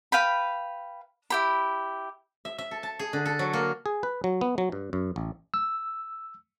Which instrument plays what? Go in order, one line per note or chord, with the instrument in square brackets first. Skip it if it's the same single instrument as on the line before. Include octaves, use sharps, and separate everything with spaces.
[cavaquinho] B4 F5 G5 B5
E4 G4 B5
[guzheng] E5
E5
A4
A5
G#4
D3
A4
F#3
A#3
[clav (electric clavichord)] G#4
B4
F#3
B3
F#3
G2
F#2
A1
[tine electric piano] E6